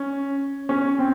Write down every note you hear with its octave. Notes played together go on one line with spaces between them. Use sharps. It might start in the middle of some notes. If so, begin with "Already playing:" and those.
Already playing: C#4
C#4
C4